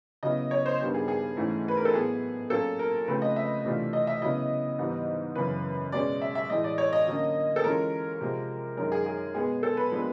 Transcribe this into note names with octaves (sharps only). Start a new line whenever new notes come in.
C#3 F#3 B3 E4 D#5
C#5
C5
G2 D#3 G3 B3
G#4
G#4
G#2 E3 A3 C#4 E4
B4
A#4
A4
A2 F#3 B3 E4 G#4
A#2 F#3 A#3 C#4 A4
A#4
C#3 F3 A3 C4 B4
D#5
E5
C3 E3 A3 D4 F4
D#5
E5
C#3 F#3 B3 E4 D#5
G#2 E3 G3 B3 D#4
F#2 C#3 E3 B4
B2 G#3 C#4 D5
E5
E5
A2 E3 G#3 D#5
D5
C#5
D#5
D3 F#3 A#3 C#4
A4
E3 G#3 C#4 F4 A#4
C3 F3 G#3
F#2 D#3 G#3 A#4
G#4
G#4
B2 G#3 B3 G#4
A4
B4
A#2 F3 G#3 B3 D4